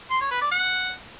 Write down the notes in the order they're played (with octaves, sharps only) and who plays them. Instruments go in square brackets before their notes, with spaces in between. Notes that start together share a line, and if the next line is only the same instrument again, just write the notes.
[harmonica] C6
C#5
B4
D5
F#5